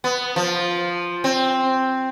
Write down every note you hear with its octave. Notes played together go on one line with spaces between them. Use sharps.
B3
F3
C4